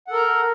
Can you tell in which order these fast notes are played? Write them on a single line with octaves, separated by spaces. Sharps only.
F#5 A4 A#4 A#5